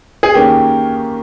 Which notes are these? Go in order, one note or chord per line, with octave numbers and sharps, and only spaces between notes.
G#4
D#2 D#3 A#3 C#4 G4